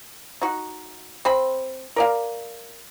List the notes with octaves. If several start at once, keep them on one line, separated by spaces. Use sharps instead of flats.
D#4 F#4
C4 C5 B5
A#4 D5 F5